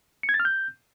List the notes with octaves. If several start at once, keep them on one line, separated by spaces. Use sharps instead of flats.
C#7
G#6
A6
F6
G6